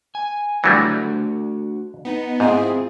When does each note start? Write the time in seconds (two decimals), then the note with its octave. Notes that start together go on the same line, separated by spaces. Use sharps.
0.15 G#5
0.64 E3 F#3 G3 A3 D4 F#4
2.05 B3 D#4
2.40 G#2 C4 E4 F4 G#4